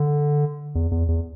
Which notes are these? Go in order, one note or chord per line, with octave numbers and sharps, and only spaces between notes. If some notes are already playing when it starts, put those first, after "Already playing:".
Already playing: D3
E2
E2
E2